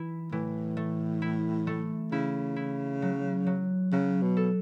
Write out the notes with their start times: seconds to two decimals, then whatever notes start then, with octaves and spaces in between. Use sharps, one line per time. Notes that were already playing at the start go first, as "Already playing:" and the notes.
Already playing: E3 E4
0.32 A2 E3
0.77 A3
1.22 E4
1.67 A3
2.11 C#3 E4
2.56 E4
3.02 F#3
3.46 F#3
3.92 C#3 F#3
4.22 B2
4.37 A4